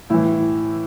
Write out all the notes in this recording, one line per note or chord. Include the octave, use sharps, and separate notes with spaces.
A2 E3 E4